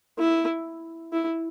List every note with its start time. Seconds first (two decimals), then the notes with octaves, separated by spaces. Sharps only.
0.19 E4
1.13 E4